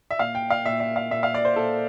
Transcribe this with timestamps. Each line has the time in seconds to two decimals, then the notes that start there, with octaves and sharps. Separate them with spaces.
0.11 E5
0.19 A#2 F5
0.35 G5
0.50 F5
0.65 A#2 E5
0.80 E5
0.96 F5
1.11 A#2 E5
1.23 F5
1.34 D5
1.45 C5
1.56 A#2 A4